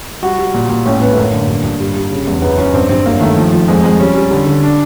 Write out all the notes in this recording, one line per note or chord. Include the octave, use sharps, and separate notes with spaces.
G3 F#4
G3
A#2
A#2
A2 C#4
A2 B3
A3
F#2 A#3
D3
G2
G2
G3
G3
C#3
E2
F#2 B3
F#2 C#4
G2 C4
G2 C4
F#2 A#3
D#3 A3
F3
F3
F2 G#3
F2 G#3
G3 C#4
G3
D3
D3
D4